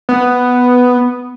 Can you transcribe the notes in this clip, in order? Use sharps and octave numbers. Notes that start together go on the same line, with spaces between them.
B3